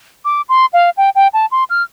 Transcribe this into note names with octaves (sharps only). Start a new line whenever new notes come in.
D6
C6
F5
G5
G5
A5
C6
F6